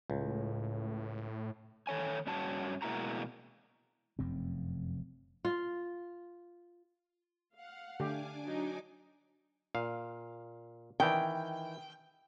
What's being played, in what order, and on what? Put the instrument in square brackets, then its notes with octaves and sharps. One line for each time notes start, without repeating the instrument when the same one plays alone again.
[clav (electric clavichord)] C#2 [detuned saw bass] A2
[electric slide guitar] D#3 A4 C#5 G#5
G2 C#4 F#4 A5
B2 G#3 A#3 E4 F#4 A#5
[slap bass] F1 F#2 C4
[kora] F4
[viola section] F5 [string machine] F#5
[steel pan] D3 A3 G4 [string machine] D4 G#5 D6
[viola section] F#3 D#4
[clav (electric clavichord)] A#2 F5
[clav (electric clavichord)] D#3 E3 [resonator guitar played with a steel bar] G5